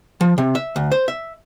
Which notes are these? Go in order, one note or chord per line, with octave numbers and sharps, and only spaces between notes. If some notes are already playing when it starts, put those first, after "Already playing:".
F3
C3
E5
D2
C5
E5